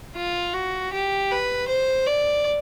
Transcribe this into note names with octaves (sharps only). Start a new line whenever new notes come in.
F4
F#4
G4
B4
C5
D5